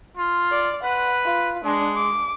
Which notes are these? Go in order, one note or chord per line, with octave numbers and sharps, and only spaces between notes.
F4
D5
B4 F#5
F4
G#3 D4
D6